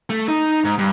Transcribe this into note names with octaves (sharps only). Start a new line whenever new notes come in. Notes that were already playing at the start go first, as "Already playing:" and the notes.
A3
D#4
G#2
G2